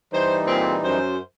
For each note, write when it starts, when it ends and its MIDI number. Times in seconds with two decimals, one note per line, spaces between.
0.13 0.99 52
0.13 0.99 55
0.13 0.99 63
0.13 0.36 72
0.45 0.75 46
0.45 0.75 60
0.45 0.75 68
0.83 1.16 42
0.83 1.16 72